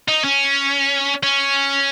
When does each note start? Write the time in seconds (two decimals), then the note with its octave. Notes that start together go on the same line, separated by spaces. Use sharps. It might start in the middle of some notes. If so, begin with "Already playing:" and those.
0.08 D#4
0.24 C#4
1.23 C#4